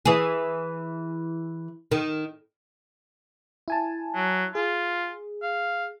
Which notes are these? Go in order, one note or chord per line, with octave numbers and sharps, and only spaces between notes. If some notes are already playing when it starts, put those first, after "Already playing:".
E3 G#4
D#3
E4 G#5 A5
F#3
F4 G#4
F5